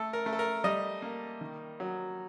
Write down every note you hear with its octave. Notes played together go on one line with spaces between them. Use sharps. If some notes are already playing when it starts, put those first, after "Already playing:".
Already playing: A3 A4
A#4
A3
A4
A#4
G3 D#5
A#3
D#3
F#3